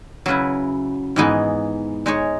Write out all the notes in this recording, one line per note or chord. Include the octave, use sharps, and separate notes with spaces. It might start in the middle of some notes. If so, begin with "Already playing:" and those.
C#3 F#3 C#4 E4 B4
G#2 E3 B3 D#4 G#4
G#3 D#4 G#4 C#5